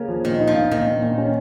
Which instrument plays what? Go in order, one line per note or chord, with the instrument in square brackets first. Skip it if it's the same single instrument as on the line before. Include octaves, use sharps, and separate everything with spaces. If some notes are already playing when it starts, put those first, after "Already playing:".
Already playing: [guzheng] C#3 [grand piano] A#3
[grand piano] F3
[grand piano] A#2 [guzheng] D#3
[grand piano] D#4
[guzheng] F3
[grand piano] A#2
[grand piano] A#2 [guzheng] D#3
[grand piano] A#2
A#2
C#4